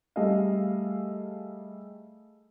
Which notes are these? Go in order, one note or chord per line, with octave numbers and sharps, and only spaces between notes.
G3 A3 G#4 A4 D#5 F5